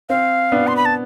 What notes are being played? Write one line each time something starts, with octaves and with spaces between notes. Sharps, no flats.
C4 F5
B3 D4
C6
B5
A5